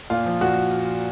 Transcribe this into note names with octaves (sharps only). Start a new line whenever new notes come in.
A#2 F4
F3
A#2 F#4